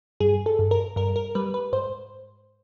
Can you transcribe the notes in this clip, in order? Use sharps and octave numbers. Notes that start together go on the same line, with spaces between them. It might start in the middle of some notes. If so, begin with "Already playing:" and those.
G2 G#4
A4
G2
A#4
G2 A#4
A#4
G3 B4
B4
G#2 C5